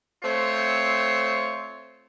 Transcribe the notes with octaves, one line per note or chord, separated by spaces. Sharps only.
A3 C4 F4 C5 C#5